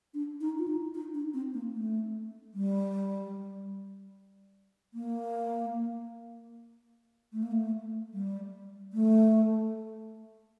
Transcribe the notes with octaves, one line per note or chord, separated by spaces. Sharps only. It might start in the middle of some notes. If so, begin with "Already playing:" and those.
D4
D#4
F4
D#4
D#4
D4
C4
A#3
A3
G3
A#3
A3
A#3
A3
G3
A3